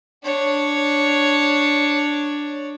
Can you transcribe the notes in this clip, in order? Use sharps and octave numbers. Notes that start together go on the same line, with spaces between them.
D4 C#5